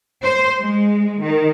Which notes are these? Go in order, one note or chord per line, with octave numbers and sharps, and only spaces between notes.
C5
G#3
D#3